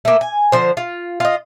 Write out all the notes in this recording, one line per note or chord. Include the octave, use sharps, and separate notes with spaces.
A3 A#3
G#5
D3 F3 C5
F4
F4 D#5